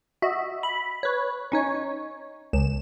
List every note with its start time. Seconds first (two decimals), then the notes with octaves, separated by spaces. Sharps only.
0.22 F#4 D#5 E5
0.63 B5
1.03 B4 C#5
1.52 C#4 D#4 C#5
2.53 C#2 E7